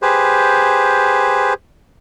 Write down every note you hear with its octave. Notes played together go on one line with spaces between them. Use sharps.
G4 G#4 B4 C5